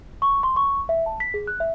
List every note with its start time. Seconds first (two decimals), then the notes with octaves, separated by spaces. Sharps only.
0.22 C#6
0.43 C6
0.56 C#6
0.89 E5
1.06 A5
1.20 B6
1.34 G#4
1.47 F#6
1.60 E5